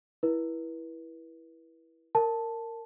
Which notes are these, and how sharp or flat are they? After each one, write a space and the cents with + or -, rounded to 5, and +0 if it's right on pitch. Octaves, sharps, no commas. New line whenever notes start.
E4 +0 B4 -35
A#4 -20 A5 +0